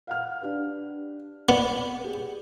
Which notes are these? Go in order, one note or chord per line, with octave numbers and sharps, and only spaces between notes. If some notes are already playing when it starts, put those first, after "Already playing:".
F5 F#5 F6
D4 G4 B4
B3 D5
G4 G#4